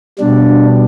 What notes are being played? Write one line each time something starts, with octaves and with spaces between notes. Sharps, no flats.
B2 G3 D4